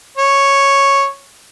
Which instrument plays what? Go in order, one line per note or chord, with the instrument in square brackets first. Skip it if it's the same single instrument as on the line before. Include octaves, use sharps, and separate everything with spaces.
[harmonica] C#5